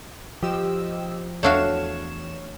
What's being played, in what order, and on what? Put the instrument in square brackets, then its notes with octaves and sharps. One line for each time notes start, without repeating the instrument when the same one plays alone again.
[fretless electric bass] F3 [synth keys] G4 D#5 E6
[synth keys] E2 E7 [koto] A3 D4 F#4 [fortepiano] C#5 F5